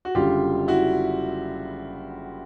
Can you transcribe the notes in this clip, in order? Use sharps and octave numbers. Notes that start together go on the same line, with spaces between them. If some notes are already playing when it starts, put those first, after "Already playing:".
F#4
F#1 F#2 D3 G3 F4 G4
E4 F#4